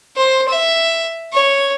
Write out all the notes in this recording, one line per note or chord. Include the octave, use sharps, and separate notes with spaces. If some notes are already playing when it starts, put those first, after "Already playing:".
C5
E5
C#5